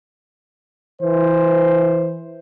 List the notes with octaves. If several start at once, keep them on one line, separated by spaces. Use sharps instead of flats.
E3 C5